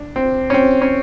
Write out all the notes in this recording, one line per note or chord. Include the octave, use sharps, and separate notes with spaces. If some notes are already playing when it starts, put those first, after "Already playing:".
Already playing: D4
C4
C#4
C4
C#4